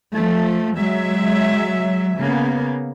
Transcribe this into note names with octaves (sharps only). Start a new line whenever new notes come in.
F3 A3
F#3 G#3 E5
C#3 A#3 B3